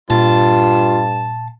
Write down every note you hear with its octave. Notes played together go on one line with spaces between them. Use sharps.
G2 A#2 F4 A5